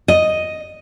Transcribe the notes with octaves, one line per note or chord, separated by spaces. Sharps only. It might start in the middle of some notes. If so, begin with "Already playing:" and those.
D#5